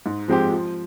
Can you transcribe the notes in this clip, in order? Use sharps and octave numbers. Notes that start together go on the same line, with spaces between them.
G#2
F3 G#3 C4 G4
F3